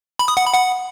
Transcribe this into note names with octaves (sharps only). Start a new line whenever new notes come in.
B5
D#6
F#5
B5
F#5